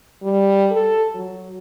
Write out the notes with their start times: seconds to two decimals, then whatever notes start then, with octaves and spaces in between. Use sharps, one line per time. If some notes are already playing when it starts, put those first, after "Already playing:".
0.23 G3
0.71 A4
1.15 F#3